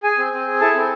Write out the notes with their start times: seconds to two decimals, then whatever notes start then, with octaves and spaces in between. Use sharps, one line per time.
0.03 G#4 G#5
0.18 C4
0.33 C4
0.47 G#4
0.60 E4 A4 A5
0.75 C4